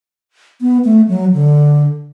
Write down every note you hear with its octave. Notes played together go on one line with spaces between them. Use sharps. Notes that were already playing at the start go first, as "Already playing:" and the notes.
B3
A3
F#3
D3